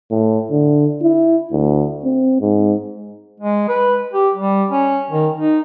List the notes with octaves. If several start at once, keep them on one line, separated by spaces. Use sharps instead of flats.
A2
D3
E4
D2
C4
G#2
G#3
B4
G4
G3
C#4
D#3
D#4